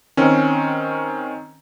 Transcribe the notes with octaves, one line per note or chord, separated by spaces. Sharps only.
D#3 C4 C#4